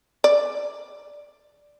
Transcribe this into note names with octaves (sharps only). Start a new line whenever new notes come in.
D5